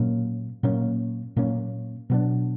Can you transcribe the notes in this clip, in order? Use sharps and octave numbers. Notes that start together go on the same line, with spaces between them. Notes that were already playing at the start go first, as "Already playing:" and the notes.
Already playing: A#2 F#3 A#3 C#4
A#2 F#3 A#3 C#4
A#2 F#3 A#3 C#4
B2 F#3 B3 D4